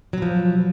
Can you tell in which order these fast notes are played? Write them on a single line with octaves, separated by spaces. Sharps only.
F#3 B2 F3